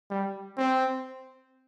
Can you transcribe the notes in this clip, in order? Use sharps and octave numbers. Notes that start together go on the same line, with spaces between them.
G3
C4